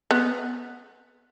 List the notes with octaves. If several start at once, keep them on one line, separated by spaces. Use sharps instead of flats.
B3